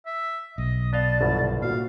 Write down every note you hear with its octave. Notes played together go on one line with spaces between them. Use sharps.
E5
B1 D#5
B3 D5 D#5 F5 A5
G1 C2 B2
A#2 F#4 F5